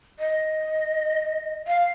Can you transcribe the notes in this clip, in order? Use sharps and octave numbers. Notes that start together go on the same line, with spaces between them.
D#5
F5